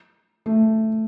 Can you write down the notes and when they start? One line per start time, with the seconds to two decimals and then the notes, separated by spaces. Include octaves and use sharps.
0.46 A3